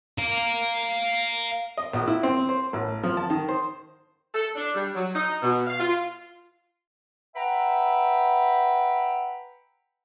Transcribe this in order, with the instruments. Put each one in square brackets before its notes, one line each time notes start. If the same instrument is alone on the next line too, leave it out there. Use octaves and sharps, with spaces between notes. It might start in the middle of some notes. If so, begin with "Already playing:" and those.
[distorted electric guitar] F5 A#5
[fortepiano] D#5
A#1
E4
C4
C5
A1
F3
A5
D#3
C5
[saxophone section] A4
D4
G3
F#3
D#4
B2
F5
F4
[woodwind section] B4 E5 F#5 G5 A#5 B5